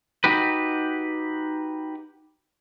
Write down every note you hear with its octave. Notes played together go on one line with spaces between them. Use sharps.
D#4 F#4 G4 B4